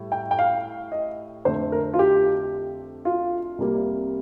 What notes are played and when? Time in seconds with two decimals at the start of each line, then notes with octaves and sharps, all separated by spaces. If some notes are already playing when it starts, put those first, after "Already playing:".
Already playing: A2 G3
0.12 G5
0.31 G5
0.39 F5
0.92 D#5
1.45 F2 D3 A3 C4 C5
1.72 A#4
1.94 F4
1.99 G4
3.05 F4
3.58 C2 C3 G3 A#3